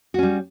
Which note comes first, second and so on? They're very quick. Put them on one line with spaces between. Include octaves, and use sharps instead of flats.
F#4 C#4 G3